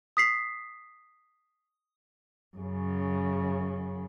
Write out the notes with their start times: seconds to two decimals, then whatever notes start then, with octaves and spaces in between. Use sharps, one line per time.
0.17 D#6 B6 C7
2.58 F#2 C#3